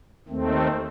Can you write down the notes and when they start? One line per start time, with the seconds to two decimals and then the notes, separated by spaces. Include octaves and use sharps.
0.28 D#2 D#3 A3 C4